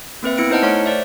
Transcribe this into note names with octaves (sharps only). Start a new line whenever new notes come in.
A#3 C4 B4 E5
B3 E4 C#7 D7
D#4 E4 C5 D#5 F#5 A5
A3 C#5 F#5 C6 F6
C5 D5 E5